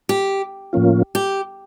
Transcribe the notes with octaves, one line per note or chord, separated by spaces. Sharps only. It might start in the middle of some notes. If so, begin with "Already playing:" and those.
G4
A2 F3 A#3 C#4 F4
G4